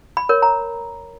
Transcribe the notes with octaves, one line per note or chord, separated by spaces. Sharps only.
B5
A#4 C#5
A#5